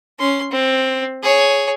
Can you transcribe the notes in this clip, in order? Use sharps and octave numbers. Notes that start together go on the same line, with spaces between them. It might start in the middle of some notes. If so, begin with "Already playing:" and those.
C#4 C6
C4
G#4 C#5